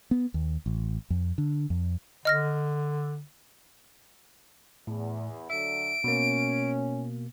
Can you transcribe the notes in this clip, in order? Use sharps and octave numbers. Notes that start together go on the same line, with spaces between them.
B3
D#2
A1
F2
D3
F2
D3 D#5 F6 A#6
E2 A2
D3 F#3 E5 D7
B2 A#3 C#4